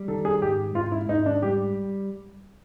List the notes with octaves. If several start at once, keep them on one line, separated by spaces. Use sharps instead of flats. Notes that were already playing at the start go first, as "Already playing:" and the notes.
Already playing: G3
D#3 A4
G#4
G#2 G4
G#2 F4
E4
G#2 D#4
D4
G3 G4